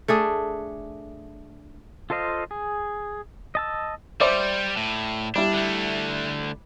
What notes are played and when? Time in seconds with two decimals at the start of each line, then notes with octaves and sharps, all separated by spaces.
0.08 A3 D4 G#4
2.10 F4 A4 C5 D#5 F5
2.51 G#4
3.55 D#5 A5 E6
4.20 G3 C5 D5 E5
4.77 A2
5.36 G3 D4 E4
5.53 D3 A3